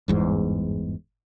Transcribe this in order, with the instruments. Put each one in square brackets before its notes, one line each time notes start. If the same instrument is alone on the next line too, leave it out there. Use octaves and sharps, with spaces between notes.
[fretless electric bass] G1 E2 G#2